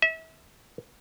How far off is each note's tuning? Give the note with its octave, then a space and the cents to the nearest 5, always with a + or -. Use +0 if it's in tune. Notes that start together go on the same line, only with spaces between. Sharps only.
E5 -30